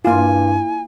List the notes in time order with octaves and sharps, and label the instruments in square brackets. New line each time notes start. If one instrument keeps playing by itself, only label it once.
[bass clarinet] G2 [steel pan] A#3 F4 [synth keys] E4 [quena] G#5